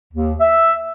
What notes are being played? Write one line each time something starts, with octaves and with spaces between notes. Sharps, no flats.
D#2
E5